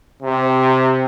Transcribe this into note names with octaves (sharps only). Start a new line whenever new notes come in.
C3